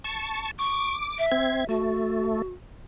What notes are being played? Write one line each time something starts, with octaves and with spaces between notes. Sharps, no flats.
A5 C#6
C#6 D6
E5
C4 G#6
A3 F#4